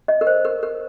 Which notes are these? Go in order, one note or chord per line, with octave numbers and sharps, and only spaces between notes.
D#5
A#4
C5
A#4
A#4